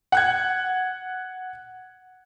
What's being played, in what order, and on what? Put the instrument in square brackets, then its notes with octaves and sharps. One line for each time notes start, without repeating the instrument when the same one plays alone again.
[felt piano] F#5 F#6 G#6